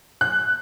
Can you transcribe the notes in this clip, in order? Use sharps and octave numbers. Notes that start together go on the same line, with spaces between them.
F#6